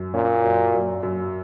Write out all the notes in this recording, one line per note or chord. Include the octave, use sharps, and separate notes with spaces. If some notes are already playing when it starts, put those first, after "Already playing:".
Already playing: F#2
A#2 C#4
F#2
F#2
F#2